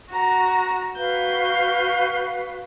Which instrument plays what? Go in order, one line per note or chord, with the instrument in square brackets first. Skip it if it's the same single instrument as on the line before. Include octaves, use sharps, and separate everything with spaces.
[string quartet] F#4 A#5
[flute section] F#4 B4 F5 [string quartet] G6